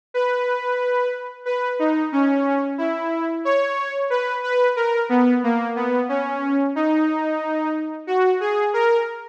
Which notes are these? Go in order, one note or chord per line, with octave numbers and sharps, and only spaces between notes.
B4
B4
D#4
C#4
E4
C#5
B4
B4
A#4
B3
A#3
B3
C#4
D#4
F#4
G#4
A#4